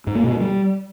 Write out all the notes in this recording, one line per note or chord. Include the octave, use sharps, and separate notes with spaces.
G#2
A#3
B2
A#3
G3